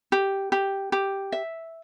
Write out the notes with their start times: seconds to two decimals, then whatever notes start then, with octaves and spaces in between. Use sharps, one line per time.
0.12 G4
0.52 G4
0.92 G4
1.32 E5